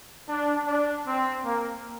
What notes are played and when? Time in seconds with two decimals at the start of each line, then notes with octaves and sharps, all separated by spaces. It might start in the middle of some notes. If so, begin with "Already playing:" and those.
0.28 D4
0.66 D4
1.06 C4
1.44 A#3